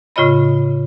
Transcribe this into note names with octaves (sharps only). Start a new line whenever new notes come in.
A2 C#3 F4 C#5 D#5 B5